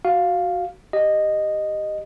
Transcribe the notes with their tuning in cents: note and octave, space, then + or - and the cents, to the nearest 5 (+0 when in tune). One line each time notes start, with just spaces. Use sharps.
F#4 +0 F5 +0
G4 +0 D#5 -10